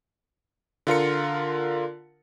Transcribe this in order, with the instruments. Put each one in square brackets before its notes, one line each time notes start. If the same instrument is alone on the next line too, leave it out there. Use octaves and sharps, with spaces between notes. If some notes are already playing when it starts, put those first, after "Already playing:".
[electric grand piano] D3 F4 A#4 C#7